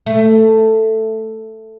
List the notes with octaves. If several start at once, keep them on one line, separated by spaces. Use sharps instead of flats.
A3